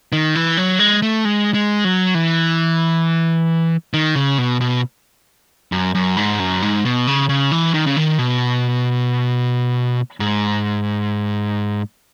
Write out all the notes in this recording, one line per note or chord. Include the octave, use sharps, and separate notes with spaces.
D#3
E3
F#3
G#3
A3
G#3
G#3
F#3
E3
D#3
C#3
B2
B2
F#2
F#2
G#2
F#2
G#2
B2
C#3
C#3
E3
D#3
C#3
D#3
B2
G#2